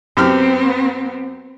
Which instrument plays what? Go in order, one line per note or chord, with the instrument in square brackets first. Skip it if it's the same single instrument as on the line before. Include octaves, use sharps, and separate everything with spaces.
[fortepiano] F#2 G4 F6 [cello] B3 C4